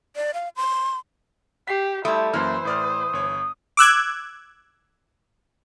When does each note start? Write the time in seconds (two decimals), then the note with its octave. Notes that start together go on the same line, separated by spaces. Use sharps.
0.16 D5
0.34 F5
0.56 C6
1.68 G4 B6 C7
2.05 G3 A3 E4 C6 D#6
2.34 F#2 E3 A#3 C5 C6 F6
2.65 A2 D5 D#6 F6
3.13 G1 C#5
3.77 D6 E6 F#6 G#6